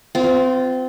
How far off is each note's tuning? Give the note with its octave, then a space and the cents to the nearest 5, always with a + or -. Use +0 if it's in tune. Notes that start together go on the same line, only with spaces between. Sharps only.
C4 -30 F4 +0